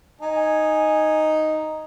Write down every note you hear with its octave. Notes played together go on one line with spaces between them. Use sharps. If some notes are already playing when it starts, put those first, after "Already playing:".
D#4 G#5